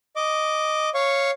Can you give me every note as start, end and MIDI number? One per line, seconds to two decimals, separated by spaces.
0.16 0.90 75
0.16 0.90 86
0.94 1.31 73
0.94 1.31 77
0.94 1.31 85